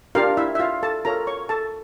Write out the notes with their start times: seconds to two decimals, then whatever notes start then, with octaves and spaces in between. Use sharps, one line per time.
0.15 D4 F4 G4 A#4 F5
0.37 E4 E5
0.55 E5
0.59 F4 F5
0.83 A4 A5
1.05 F4 A4 A#4 C#5 A#5
1.27 C#5 C#6
1.49 A4 A5